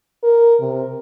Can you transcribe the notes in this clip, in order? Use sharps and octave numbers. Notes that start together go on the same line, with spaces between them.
A#4
C3